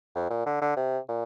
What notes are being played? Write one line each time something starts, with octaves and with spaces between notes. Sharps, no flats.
F2
A#2
D3
D3
C3
A#2